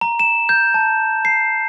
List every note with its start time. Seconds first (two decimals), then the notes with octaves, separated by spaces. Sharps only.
0.01 A#5
0.20 E7
0.49 G6
0.74 A5
1.25 C7